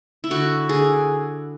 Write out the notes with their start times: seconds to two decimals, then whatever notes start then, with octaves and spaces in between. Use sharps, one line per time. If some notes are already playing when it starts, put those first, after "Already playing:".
0.24 E4
0.30 D3 F#4
0.69 D3 G#4